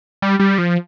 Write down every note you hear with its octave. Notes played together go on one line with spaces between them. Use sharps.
G3
G3
F3